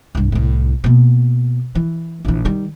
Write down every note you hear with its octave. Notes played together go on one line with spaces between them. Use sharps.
C2 G2
C2 A2
B2 A#3
E3
A#1 E3
D#3 G3